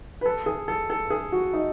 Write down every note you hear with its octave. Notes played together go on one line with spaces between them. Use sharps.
B4
A4
G#4
A4
A4
G#4
F#4
D#4